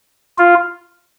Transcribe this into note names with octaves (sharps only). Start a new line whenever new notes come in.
F4